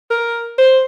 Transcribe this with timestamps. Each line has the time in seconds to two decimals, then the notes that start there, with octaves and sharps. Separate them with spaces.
0.10 A#4
0.58 C5